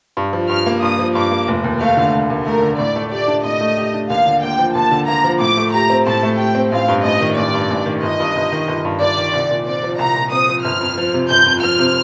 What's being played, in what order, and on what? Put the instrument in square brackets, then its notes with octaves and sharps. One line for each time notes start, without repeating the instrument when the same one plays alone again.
[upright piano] G2
F3
[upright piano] G2 [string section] F6
[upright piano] A#3
[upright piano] G2 [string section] D#6
[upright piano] F3
[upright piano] G2 [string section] D6
[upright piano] A#3
F1
D#2
[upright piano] A3 [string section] F5
[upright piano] D3
F1
D#2
[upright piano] A3 [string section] A#4
[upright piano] D3
[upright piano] A2 [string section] D5
[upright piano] A3
[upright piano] G4 [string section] D5
[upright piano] D4
[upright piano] A2 [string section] D#5
[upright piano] A3
G4
D4
[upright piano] D#2 [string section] F5
[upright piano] D3
[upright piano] A#3 [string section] G5
[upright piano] F3
[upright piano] D#2 [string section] A5
[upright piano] D3
[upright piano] A#3 [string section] A#5
[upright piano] F3
[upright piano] A2 [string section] D6
[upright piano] A3
[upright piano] G4 [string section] A#5
[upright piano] C4
[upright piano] A2 [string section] A5
[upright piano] A3
[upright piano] G4 [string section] G5
[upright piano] C4
[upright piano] A1 [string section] F5
[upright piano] G2
[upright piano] A1 [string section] D#5
[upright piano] D#3
[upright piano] A1 [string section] D5
[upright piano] G2
A1
D#3
[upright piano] G1 [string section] D#5
[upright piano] G2
G1
D#3
G1
G2
[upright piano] G1 [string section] D5
[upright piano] D#3
C2
A#2
[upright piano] C4 [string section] D5
[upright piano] F3
[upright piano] C2 [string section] A#5
[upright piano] A#2
[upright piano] C4 [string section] D#6
[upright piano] F3
[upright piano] G1 [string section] F6
[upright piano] F2
F3
C3
[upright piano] G1 [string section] G6
[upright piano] F2
[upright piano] F3 [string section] F6
[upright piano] C3